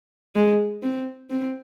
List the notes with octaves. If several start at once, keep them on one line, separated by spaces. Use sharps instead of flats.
G#3
C4
C4